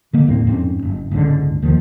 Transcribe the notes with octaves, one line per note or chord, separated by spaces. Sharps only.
D3 A#3 B3
E2 A2 A#3 C4
F2 G#2 C4 C#4
F#1
F#1 C#2 G#2 D3
D#2 D#3 F3